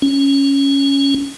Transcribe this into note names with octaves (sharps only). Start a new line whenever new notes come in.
C#4